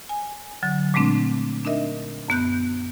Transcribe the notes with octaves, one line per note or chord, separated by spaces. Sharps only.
G#5
D3 F#3
A#2 G#3 A3 C4 D4
D4 D#4 A#4 D#5 E5
F#2 B3 F#6 G6